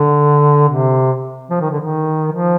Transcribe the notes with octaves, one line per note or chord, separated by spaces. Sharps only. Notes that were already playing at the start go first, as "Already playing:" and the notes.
Already playing: D3
C3
F3
D#3
D3
D#3
F3